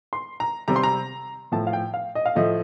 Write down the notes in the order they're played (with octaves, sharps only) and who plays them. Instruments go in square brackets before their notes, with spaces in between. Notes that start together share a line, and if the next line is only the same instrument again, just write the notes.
[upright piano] C6
A#5
C3 G3 C4 A#5
C6
A#5
A2 F3 A3 A5
F5
G5
F5
D#5
F5
A2 F3 A3 D#5